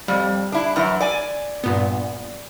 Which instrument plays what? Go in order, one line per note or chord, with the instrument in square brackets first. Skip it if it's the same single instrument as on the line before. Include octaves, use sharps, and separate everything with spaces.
[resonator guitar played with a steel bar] F2 [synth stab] G3
[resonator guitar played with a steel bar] D4 E4
F#2 E3
D5 G#5
[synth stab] G2 A#2 B3